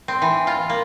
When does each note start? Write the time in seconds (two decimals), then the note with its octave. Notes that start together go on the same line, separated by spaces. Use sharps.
0.08 C4
0.22 E3
0.47 F4
0.70 A#3